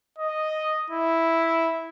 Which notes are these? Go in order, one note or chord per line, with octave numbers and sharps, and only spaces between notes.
D#5
E4